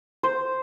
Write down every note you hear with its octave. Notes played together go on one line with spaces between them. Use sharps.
C5